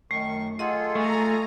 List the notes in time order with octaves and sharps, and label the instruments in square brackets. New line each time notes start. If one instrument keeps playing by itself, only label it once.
[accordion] F#2 D#3 C#6 [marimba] A3
[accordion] F4 G#4 A4 [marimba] D#5 F#5 C6
[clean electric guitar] A3 [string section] G#5 A#5